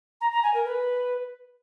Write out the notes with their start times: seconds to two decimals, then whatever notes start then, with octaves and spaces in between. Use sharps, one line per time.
0.21 A#5
0.32 A#5
0.43 G#5
0.54 A#4
0.65 B4